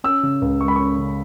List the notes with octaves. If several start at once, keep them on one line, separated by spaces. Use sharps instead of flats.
C#4 E6
C#3
C#2
G#3 C#6
B5
C#4 C#6
C#3